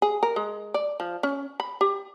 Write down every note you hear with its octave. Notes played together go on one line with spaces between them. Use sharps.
G#4
A#4
G#3
D5
F3
C#4
B5
G4